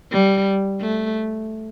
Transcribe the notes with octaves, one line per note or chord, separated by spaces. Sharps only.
G3
A3